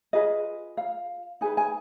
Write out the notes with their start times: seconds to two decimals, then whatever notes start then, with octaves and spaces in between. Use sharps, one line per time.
0.13 F4 G#4 B4 D#5
0.77 F5
1.41 D#4 G#4 B4 G#5
1.57 G#5